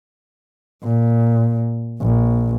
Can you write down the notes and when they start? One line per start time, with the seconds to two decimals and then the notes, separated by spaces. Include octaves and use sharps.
0.84 A#2
2.01 A#1